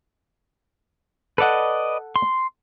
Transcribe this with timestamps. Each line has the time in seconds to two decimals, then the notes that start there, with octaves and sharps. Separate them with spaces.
1.38 A4 B4 D5 D#5 F#5
2.16 C6